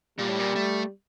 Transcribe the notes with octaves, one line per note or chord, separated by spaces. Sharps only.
A#2 G3
A2
A#2
A3